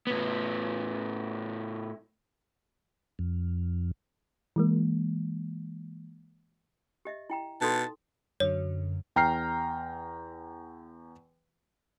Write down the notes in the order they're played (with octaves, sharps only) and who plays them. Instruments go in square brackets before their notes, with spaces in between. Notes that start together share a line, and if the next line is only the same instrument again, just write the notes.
[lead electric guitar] A2 B3
[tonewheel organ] F2
[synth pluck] E3 G#3 A#3
[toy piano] G4 D#5 E5
E4 G5 A#5
[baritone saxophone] B2 [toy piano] D#4 A4 C6 [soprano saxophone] A5
[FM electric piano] F#2 D3 F#3 [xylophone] C#5
[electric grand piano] E2 G5 A#5 F6 C7